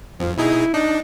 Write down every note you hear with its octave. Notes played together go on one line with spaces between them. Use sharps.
F2 F3
B2 D#4 E4 G#4
D4 D#4